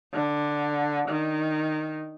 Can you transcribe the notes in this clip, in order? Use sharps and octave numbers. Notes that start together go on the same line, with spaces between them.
D3
D#3